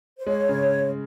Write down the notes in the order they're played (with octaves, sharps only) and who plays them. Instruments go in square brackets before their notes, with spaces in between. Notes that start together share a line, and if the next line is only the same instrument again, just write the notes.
[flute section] C5
[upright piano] G#3 [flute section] C#5
[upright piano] C#3